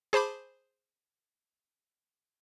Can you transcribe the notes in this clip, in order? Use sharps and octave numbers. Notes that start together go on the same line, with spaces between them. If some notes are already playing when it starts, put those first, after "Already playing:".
G#4 C5 A5 B5 D6